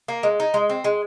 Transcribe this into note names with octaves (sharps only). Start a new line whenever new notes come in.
A#3
G#3
D#4
G#3
C4
G#3